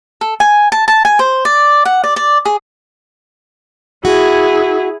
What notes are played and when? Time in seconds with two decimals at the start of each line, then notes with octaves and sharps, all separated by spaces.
0.21 A4
0.40 G#5
0.72 A5
0.88 A5
1.05 G#5
1.19 C5
1.45 D5
1.85 F#5
2.04 D5
2.16 D5
2.45 G#4
4.05 E4 F#4 G#4